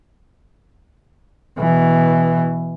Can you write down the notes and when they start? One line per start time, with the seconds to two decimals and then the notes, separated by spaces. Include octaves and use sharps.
1.58 B2 E3